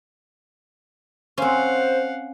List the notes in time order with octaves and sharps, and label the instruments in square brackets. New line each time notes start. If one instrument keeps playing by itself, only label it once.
[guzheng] C4 C#4 [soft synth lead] C5 [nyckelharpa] F5 F#5